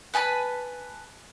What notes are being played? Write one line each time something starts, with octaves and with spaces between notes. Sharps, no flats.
B4 G#5 A5 B5